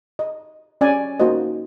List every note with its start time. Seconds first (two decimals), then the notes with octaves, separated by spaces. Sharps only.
0.19 D#5
0.81 C#4 D5 G#5
1.20 A#3 D#4 F#4 C5 D#5